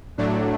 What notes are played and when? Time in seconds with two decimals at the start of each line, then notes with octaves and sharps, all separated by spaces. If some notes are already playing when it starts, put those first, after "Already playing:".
0.18 A2 F#3 A3 D4